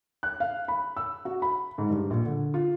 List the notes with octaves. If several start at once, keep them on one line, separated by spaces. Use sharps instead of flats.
F#6
F5
B5
E6
F#4
B5
G#2
G2
A#1
D3
F4